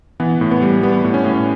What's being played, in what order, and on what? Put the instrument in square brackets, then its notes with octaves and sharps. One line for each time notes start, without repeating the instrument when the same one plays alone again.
[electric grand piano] E3 B3
A2
B3
G3
G3 B3
A2
C#4
A2